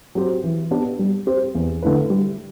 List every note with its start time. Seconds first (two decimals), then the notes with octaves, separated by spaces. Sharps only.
0.15 F#3 C4 G4 C5
0.43 E3
0.71 B3 D4 G4 B4
0.99 G3
1.26 C4 G4 C5
1.55 E2
1.82 D3 A3 E4 B4
2.10 G3